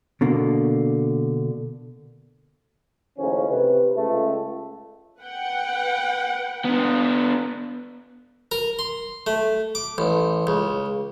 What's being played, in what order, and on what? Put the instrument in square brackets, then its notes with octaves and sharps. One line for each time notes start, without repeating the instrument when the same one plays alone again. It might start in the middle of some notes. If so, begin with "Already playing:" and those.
[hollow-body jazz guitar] B2 D3 A#3
[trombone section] D#2 A2 C#3 F3 C#4
C3 B4
C#2 A3
[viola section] B4 F#5 G5
[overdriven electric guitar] B3 D4
[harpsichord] A#4
C6
A3
D6
A1
C#2